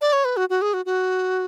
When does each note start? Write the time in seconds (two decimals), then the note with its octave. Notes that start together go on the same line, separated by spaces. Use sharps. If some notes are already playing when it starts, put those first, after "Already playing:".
0.01 D5
0.13 C#5
0.25 B4
0.37 F#4
0.50 F#4
0.62 G#4
0.74 F#4
0.86 F#4